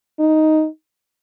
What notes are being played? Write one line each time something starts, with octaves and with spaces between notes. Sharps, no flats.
D#4